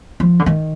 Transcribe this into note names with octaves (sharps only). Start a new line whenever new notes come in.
F3
D3
D#3